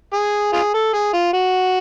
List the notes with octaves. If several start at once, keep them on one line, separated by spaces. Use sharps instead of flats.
G#4
F4 G#4
A4
G#4
F4
F#4